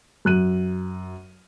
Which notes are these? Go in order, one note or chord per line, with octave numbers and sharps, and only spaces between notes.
F#2 F#6 D#7